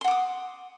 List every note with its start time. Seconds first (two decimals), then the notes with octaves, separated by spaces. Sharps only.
0.01 C6
0.04 F#5
0.08 D6
0.11 D#6